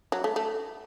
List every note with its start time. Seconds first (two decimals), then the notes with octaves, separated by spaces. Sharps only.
0.12 F#3
0.24 A3
0.36 A3